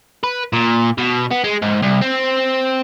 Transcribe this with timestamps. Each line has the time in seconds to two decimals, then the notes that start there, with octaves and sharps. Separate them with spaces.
0.24 B4
0.53 A#2
0.98 B2
1.31 B3
1.44 G#3
1.62 G#2
1.83 C2
2.02 C4